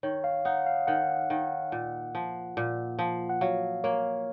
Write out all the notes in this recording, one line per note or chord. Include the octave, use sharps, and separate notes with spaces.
D#3 C#5
F5
D#4 F#5
F5
D#3 F#5
D#3
A#2
F3
A#2
F3
F#5
F#3 F5
A#3 C#5